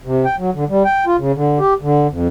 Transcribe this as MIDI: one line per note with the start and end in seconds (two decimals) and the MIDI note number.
0.05 0.25 48
0.25 0.36 79
0.38 0.50 54
0.54 0.64 50
0.69 0.83 55
0.85 1.05 79
1.07 1.16 65
1.19 1.32 49
1.36 1.59 50
1.59 1.74 67
1.82 2.07 50
2.11 2.28 41